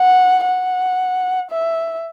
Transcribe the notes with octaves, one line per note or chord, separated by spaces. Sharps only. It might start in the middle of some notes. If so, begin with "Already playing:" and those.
Already playing: F#5
F#5
E5